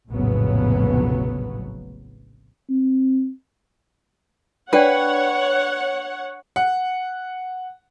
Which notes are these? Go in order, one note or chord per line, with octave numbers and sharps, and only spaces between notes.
F1 A#1 A2 C#3 F#3 B3
C4
D4 B4 C#5 D5 F#5 G5
F#5